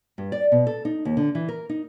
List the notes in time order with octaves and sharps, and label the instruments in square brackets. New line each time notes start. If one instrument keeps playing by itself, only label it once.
[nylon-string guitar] G2
D5
B2
A4
D#4
D#2
D3
E3
A#4
D#4